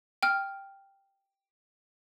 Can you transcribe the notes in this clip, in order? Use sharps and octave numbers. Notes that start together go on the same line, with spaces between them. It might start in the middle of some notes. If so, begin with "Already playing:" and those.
G5 F6